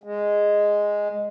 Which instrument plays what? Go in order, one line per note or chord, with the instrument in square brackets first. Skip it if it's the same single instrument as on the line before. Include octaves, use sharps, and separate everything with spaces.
[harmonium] G#3